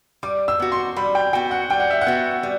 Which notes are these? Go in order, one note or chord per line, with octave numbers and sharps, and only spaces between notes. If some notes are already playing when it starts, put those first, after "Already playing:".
G3 D6
E6
B3 F#4
C6
G3 B5
G5
B3 F#4 G5
F#5
G3 G5
F#5
E5
F#5
B3 F#4
G3